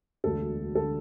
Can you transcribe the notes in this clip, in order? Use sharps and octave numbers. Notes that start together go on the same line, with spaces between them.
E1 D2 D3 A4
E1 D3 A4